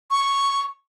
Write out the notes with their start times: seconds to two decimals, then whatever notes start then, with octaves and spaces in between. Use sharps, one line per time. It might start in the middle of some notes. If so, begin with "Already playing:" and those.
0.11 C#6